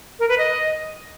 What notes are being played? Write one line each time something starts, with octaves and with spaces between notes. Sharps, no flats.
A#4
B4
D#5